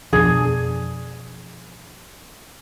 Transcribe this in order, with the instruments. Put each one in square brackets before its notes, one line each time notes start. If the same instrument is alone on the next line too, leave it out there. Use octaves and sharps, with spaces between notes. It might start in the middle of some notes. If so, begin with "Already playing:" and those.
[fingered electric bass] F2 B2 F3 [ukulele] D4 G#4